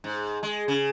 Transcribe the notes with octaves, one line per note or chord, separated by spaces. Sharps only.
G#2
G#3
C#3